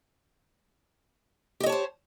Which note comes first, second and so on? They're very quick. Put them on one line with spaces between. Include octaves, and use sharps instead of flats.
G4 D#5 C#5 A5 C5